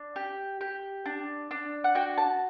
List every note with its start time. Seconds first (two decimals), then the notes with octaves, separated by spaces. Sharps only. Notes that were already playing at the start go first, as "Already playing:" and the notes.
Already playing: D4
0.16 G4
0.61 G4
1.06 D4
1.51 D4
1.84 F#5
1.95 F#4 G5
2.18 A5